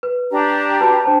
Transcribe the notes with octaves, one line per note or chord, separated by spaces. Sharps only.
B4
D4 G4 A#5
F#4 B4 A5
D4 C5 A5